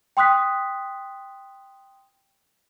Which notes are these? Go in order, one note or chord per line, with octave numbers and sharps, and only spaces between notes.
G5 C6 D#6 F#6 B6